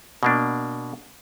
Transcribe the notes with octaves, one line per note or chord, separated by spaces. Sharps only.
B2 A#3 D4